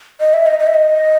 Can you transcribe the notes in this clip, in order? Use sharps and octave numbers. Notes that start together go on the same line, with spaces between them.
D#5
E5
D#5
D#5
E5
D#5